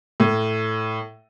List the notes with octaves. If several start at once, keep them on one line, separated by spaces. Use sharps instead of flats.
A2